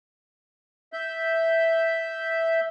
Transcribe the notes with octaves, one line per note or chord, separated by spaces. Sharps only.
E5 G6